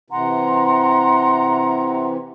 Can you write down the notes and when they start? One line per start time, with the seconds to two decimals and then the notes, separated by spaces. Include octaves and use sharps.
0.10 C3 E3 F#5 A#5 C6